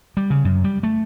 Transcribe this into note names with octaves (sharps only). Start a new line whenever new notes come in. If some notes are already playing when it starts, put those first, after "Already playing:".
G3
C#3
F#2
G3
A3